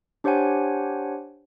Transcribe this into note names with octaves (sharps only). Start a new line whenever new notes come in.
D4 G4 C5 C#5 F#5 G#5